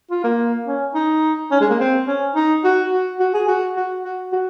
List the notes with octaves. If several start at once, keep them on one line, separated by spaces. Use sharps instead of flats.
F4
A#3
C#4
D#4
C#4
G#3
A#3
C4
C#4
D#4
F#4
F#4
F#4
G#4
F#4
F#4
F#4
F#4